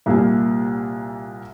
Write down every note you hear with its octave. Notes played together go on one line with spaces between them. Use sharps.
C2 A#2 G3 A#3 G#5